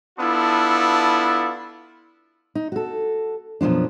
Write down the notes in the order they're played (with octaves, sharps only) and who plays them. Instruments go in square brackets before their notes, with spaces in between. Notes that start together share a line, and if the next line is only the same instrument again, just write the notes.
[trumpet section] B3 D4 E4 F4 A4
[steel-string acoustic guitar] D#4
F#4 A4
F#2 B2 D#3 F3 D4